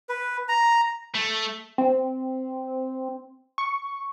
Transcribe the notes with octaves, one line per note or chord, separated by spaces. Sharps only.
B4
A#5
A3
C4
C#6